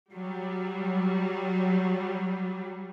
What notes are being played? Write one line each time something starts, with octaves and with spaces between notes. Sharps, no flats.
F#3 G3